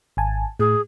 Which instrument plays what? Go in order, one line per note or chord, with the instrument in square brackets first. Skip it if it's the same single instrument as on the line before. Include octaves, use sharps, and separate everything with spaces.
[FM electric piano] G#1 G#5 A5
[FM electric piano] A2 [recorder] G#4